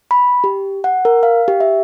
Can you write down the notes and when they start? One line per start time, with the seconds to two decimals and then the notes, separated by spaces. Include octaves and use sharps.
0.11 B5
0.44 G4
0.84 F#5
1.05 A#4
1.23 F5
1.48 G4
1.60 E5